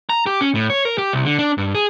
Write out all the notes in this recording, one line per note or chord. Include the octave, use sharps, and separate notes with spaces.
A#5
G4
C#4
A2
C#5
A#4
G4
C2
D3
D4
G2
G#4